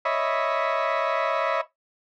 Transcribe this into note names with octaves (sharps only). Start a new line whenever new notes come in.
C#5 D#5 E5 B5